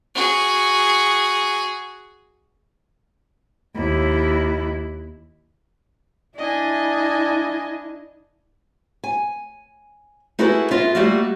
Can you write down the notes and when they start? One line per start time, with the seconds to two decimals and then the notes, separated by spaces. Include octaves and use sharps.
0.15 F#4 G#4
3.75 D#2 E4
6.38 D4 E4 D#5 G#5
9.04 G#5
10.39 D#4 E4 F#4 G#4 A4 B4
10.71 F4 D#5 E5
10.95 G3 A3 A#3 F#4 F5